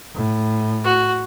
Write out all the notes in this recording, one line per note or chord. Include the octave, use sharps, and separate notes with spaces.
A2
F#4